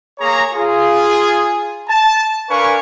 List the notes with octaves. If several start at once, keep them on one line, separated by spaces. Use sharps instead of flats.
A#3 G#4 C#5 A#5
F4 G#4
A5
D4 A#4 B4 F5 G#5 C#6